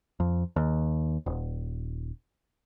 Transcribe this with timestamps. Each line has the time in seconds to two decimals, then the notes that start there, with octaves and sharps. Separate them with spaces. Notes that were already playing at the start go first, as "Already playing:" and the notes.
0.20 F2
0.56 D#2
1.26 D#1